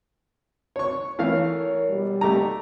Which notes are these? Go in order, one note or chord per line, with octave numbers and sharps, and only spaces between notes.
C#5 C#6
E3 A3 A#4 C#5 F5
B2 G3
A3 G4 A#5